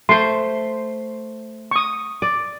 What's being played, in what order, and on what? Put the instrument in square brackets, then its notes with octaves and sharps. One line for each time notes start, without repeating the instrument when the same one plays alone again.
[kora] A3 C5 [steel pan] C6
[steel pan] C#6 D#6
[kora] D5